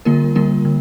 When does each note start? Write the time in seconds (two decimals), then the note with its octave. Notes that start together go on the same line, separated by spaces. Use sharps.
0.05 D3 G3 A#3 F4 A#4
0.35 D3 G3 A#3 F4 A#4
0.65 D3